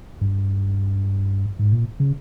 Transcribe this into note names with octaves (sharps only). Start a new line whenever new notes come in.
G2
G#2
A#2
C#3